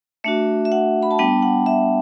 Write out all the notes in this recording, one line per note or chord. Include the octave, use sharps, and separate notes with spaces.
A3 D4 F#4 E5
E5
F#5
B5
A5
G3 B3 D4 G5
F#5
E5